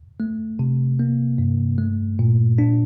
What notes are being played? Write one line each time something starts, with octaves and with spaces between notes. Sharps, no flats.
A3
C3
A#3
G2
A3
A#2
D4